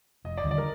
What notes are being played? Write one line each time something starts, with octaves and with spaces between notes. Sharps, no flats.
F1 D#5
D5
D#2 D3 G3
D5
A#4